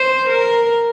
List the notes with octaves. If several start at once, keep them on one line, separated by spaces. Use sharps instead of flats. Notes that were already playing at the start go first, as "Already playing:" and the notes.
Already playing: C5
A#4